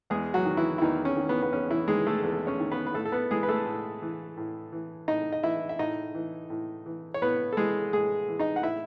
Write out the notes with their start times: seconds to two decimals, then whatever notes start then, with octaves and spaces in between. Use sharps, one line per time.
0.10 E2 G#3 G#4
0.34 F#3 F#4
0.45 D#3
0.57 E3 E4
0.78 E4
0.82 E2 D#3 D#4
1.05 C#4
1.17 D#3
1.29 B3
1.42 B3
1.53 E2 C#4
1.71 E3 E4
1.88 D#3 G#3 G#4
2.07 A3 A4
2.23 E2
2.47 C#4 C#5
2.60 D#3
2.72 B3 B4
2.87 B4
2.94 A2 A3 A4
3.05 A4
3.12 B3 B4
3.31 E3 G#3 G#4
3.43 B4
3.48 A3 A4
3.66 A2
4.02 E3
4.37 A2
4.72 E3
5.08 A2 D#4 D#5
5.32 D#5
5.43 E3 E4 E5
5.69 E5
5.79 A2 D#4 D#5
6.15 E3
6.50 A2
6.86 E3
7.14 C#5
7.22 A2 B3 B4
7.53 A4
7.57 E3 G#3 G#4
7.93 A2 G#3 G#4
8.28 E3
8.39 D#4 D#5
8.56 F#5
8.63 A2 E4 E5